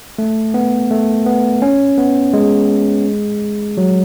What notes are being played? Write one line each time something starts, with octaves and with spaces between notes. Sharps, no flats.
A3
B3
A3
B3
C#4
B3
G#3
F#3